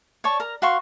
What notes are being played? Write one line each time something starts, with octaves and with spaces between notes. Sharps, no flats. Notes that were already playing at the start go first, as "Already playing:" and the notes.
C#5 D5 A5 C#6
A#4 A#5
F#4 F5 C6 C#6